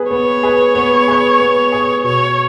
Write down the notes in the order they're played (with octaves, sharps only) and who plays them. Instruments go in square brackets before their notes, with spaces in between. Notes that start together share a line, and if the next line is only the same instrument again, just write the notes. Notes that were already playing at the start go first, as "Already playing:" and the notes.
Already playing: [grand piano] B3 G#4 B4
[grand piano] B3 [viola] C#5
[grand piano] G#4 B4
B3
G#4 B4
B3
G#4 B4
[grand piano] B2 [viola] C#5